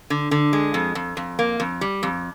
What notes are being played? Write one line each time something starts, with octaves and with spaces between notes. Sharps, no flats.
D3
D3
G#3
F2
F2
F2
A#3
F2
G3
F2